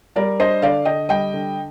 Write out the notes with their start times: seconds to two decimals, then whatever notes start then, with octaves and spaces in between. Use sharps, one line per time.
0.16 G3 A#4 D5
0.40 D4 C5 D#5
0.62 D3 D5 F5
0.85 D3 D#5 G5
1.09 G3 D#5 G5
1.33 D3